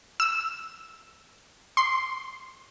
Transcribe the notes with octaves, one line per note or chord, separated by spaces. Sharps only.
E6
C6